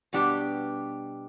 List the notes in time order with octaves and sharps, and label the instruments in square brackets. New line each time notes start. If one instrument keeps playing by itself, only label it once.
[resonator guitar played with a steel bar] B2 G3 B3 D4 G4